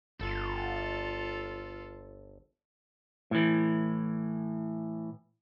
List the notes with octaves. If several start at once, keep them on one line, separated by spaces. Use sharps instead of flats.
G1 F4 A4
A2 E3